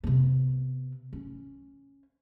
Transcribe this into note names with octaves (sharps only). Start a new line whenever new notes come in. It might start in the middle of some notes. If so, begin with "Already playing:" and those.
C3 B3
C#4